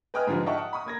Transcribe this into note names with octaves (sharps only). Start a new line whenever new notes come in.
B4 D#5 G5 G#5 D#6 F6
G#2 D3 E3 F3 G3
D#5 E5 F#5 G5 A5 C#6
F#5
B5 C#6 D#6
A#3 G#6 A#6